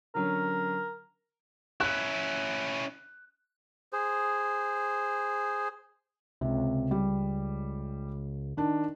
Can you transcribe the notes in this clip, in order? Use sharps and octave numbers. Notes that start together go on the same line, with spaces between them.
D3 F#3 C#4 A#4
C#4 E4 F#6
G#4 C5
C#2 C3
G3
D#3 D4